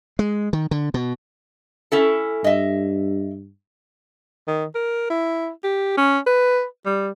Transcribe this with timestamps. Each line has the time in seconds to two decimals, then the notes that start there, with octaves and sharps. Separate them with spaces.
0.19 G#3
0.53 D#3
0.71 D3
0.94 B2
1.92 C#4 E4 A4
2.44 G2 D#5 E5
4.48 D#3
4.75 A#4
5.10 E4
5.64 G4
5.97 C#4
6.26 B4
6.86 G3